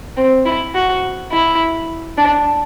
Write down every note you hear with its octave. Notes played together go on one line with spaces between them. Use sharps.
C4
E4
F#4
E4
D4